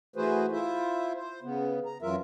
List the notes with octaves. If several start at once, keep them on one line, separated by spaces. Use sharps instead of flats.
E3 A3 F#4 G#4 B4 C5
E4 F4 C5 E5
C5
C#3 B3
A#5
F#2 E3 F#3 F4 A#4 E5